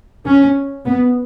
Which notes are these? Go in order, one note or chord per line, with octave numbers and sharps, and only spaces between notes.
C#4
B3